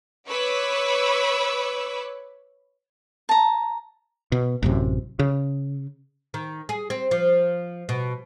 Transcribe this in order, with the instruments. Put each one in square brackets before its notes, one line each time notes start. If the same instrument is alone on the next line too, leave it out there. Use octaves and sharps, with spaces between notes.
[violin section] B4 C#5 B5 C#6 D6 E6
[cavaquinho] A5 A#5
[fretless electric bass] B2
A1 F#2 C3
C#3
[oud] D#3
G#4
C4
F3
B2